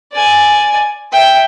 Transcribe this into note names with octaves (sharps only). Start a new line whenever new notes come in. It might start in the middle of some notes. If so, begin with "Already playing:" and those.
D5 G#5
E5 G5